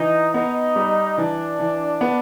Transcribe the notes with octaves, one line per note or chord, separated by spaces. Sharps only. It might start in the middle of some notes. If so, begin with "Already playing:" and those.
Already playing: E3 D#4
B3 D#4
G3
E3 D4
E3
B3